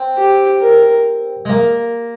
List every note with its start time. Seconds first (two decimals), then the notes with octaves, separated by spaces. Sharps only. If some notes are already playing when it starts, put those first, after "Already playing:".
Already playing: C4
0.17 G4
0.61 A#4
1.45 G#3
1.49 A#3 A#4